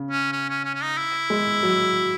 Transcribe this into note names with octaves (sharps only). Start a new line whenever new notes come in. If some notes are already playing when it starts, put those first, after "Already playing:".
Already playing: C#3
C#4
C#4
C#4
C#4
C#4
D#4
E4
G#3
F#3